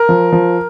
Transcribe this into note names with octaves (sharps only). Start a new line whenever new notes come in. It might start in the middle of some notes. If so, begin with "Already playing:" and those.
Already playing: A#4
F3
F3